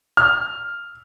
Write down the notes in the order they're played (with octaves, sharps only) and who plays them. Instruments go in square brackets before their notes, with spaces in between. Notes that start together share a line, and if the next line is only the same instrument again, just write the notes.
[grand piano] F6